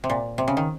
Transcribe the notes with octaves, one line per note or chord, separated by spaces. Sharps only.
C3
A#2
C3
C#3
D#3